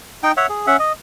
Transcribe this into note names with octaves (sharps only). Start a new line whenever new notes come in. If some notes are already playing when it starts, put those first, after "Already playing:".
D#4 G5
C#5 E5 F#5
G#4
C#4 E5 F#5
D#5